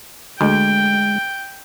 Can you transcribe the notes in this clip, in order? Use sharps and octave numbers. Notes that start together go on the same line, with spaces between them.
D2 G#3 G5